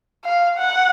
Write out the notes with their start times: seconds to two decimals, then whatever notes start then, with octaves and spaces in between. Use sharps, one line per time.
0.25 F5
0.58 F#5